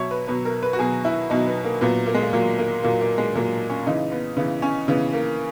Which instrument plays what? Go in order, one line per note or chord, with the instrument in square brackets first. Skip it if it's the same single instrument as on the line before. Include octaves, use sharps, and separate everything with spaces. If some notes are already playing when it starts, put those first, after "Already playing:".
Already playing: [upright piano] B2 F#3 C#5 E5
B4
B2 F#3 B4
A#4
B4
F#4
B2 F#3 G#4
E4
B2 F#3 D#4
B3
A#3
A#2 F#3 B3
A#3
G#3
A#3
A#2 F#3 A#3
A#3
A#2 F#3 A#3
A#3
G#3
A#2 F#3 A#3
C#4
C#3 E3 D#4
B3
C#3 E3 B3
C#4
C#3 E3 B3
A#3